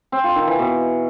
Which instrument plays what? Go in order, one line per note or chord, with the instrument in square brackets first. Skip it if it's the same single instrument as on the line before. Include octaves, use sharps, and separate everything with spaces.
[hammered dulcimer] C4
F4
D#3
E3
B2